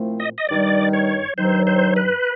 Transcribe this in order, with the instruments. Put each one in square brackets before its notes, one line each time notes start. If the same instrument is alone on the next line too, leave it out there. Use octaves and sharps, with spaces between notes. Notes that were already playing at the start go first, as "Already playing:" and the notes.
Already playing: [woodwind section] A#2 F3 A3 C4 E4
[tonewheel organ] D#5
D#5
[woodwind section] G2 D#3 G3 [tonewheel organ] D5
[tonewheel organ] C#5
[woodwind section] G2 D#3 F#3 [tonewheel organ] C5
[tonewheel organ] C5
B4